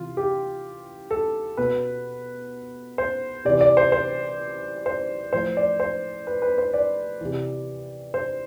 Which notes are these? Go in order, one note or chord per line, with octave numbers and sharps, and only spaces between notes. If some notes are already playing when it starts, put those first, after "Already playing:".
Already playing: C3 E3 F4
G4
A4
B2 B4
C5
C3 E3 D5
D5
C5
C5
C5
A2 F3 C5
D5
C5
B4
B4
C5
D5
C3 E3
C5